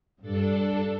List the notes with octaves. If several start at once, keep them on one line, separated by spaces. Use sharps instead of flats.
G2 D4 A4